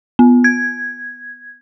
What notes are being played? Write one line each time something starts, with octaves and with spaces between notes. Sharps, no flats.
B3
G#6